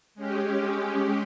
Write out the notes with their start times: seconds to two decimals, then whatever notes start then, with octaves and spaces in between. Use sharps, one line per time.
0.15 G#3 C#4 G4